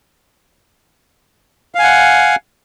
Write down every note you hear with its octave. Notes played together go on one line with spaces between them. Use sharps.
F5 F#5 G#5